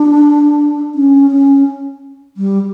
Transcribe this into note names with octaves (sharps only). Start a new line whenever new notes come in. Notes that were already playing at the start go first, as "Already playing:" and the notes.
Already playing: D4
C#4
C#4
G3